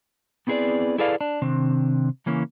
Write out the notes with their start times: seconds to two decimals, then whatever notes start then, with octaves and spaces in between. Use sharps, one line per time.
0.47 B3 C4 E4 G#4 B4 D5
0.98 E4 G#4 A4 B4 D5 F5
1.21 D4
1.42 C3 D#3 C4 D4
2.26 C#3 E3 A#3 C#4 E4